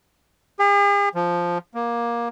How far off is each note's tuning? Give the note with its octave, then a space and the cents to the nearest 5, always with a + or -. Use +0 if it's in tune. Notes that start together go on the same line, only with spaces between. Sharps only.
G#4 -45
F3 +0
A#3 +15